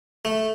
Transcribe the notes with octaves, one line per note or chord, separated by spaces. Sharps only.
A3